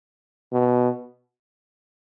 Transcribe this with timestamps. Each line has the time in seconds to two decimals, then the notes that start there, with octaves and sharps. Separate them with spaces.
0.52 B2